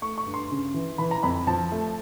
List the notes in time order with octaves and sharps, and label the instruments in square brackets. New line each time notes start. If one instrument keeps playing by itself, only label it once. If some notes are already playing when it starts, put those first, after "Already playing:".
[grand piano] A3 C#6
C#6
G2
C6
C#3
E3
E3 B5
A#5
F2 B5
F3 A5
A3